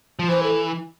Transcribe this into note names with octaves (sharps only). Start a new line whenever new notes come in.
F3
E3 C5
A4